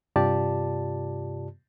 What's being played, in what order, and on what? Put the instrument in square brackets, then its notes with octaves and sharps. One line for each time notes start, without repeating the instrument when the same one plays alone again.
[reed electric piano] G2 C3 F4 G4 D5 A5